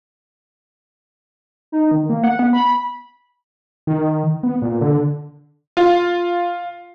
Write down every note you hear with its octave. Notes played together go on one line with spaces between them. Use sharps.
D#4
D#3
A#3
F#5
B3
B5
D#3
B3
A#2
D3
F4